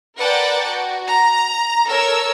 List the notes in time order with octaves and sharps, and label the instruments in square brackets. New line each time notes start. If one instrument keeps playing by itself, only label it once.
[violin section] A#4 B4 D5 F#5 G5 A5
F#4
A#5
A4 A#4 C#5 E6